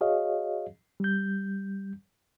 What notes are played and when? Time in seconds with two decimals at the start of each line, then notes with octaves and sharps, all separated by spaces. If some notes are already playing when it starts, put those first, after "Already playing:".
0.01 F#4 G#4 C#5 D#5 F5
1.00 G3 G6